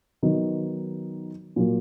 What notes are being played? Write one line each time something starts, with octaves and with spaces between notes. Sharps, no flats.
D#3 F#3 B3 D#4
A#2 F#3 A#3